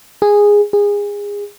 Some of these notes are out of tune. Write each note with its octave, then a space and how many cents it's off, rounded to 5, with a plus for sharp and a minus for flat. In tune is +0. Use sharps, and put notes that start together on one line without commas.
G#4 -10
G#4 -25